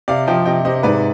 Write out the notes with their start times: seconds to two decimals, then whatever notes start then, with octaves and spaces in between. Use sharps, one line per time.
0.08 C3 D5 F5
0.27 F3 D#5 G5
0.45 C3 D#5 G5
0.65 C3 C5 D#5
0.83 G#2 B4 D5